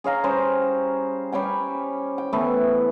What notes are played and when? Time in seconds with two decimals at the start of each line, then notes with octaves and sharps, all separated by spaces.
0.04 G#4 C#5 F5 A#5
0.24 G3 C#4 G#4 C5
1.32 G3 C#4 G5 G#5
2.18 G5
2.33 E3 A3 B3